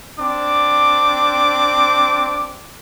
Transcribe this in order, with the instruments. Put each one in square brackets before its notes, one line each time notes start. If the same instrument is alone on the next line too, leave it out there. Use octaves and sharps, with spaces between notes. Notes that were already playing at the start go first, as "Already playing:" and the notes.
[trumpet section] C4 D4 D6